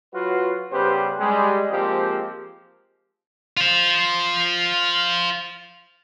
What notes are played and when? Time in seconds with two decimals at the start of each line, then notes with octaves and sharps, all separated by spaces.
0.13 F#3 F4 F#4 B4
0.72 C#3 G3 B3 G4 B4 C5
1.19 G3 G#3
1.70 F3 G#3 A#3 C4 G4
3.57 F4 C5